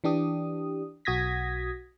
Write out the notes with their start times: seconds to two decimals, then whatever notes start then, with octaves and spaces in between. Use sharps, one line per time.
0.04 E3 D4 G4 D#6
1.05 B1 F#4 D#6 G#6 A#6 B6